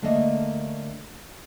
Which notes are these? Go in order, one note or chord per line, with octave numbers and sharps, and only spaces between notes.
D3 A3 A#3 D4 D#5